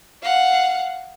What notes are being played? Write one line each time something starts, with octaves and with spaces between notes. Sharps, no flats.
F5 F#5